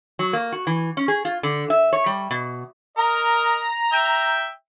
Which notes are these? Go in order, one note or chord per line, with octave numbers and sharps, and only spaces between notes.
F#3
A#3
F#4
E3
C#4
G#4
F4
D3
E5
C#5
G3
B2
A#4 D#5 A#5
E5 G5